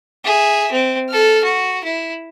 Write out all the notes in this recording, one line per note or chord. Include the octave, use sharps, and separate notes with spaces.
G#4 E5
C4
A4 F6
F#4
E4